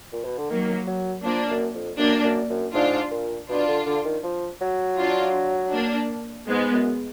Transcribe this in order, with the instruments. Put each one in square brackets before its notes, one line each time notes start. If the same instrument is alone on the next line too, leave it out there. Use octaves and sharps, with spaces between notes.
[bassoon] A#2
B2
D3
[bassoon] D#3 [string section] F#3 A#3
[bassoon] F#3
[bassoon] F3 [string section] A#3 D4
[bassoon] F#2
F2
[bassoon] F#2 [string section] A#3 D4
[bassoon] F#2
F#2
[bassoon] G#2 [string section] D4 F4
[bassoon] A#2
[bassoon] B2 [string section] D4 F4
[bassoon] D3
D3
D#3
F3
F#3
[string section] D4 F4
A#3 D4
[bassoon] G#2 [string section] G#3 B3
[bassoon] F#2